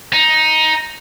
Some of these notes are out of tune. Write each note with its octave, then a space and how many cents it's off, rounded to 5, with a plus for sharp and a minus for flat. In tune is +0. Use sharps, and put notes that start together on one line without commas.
D#4 +10